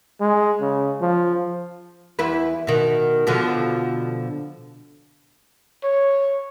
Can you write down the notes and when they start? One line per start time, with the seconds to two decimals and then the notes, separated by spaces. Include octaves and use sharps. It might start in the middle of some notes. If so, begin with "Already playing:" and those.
0.20 G#3
0.61 C#3
1.01 F3
2.19 E2 E4 B4
2.67 B2 D#3
3.27 B2 D3 F3
5.84 C#5